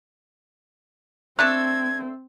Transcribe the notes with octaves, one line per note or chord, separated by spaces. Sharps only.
A3 C4 D4 A4 F#6 G#6